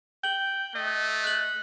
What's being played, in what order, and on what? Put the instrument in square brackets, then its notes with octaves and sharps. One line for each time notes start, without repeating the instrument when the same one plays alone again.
[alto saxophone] G5 [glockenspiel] F#7 G7
[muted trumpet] A3 [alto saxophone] D#5
[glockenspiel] F#6 F#7